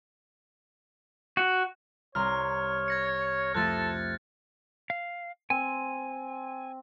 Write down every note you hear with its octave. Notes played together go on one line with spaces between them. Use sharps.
F#4
C2 C#5 A#5 C6 F6
G#6 A#6 C#7
F2 F3 A3 A4 F#6 A6
F5
C4 G#5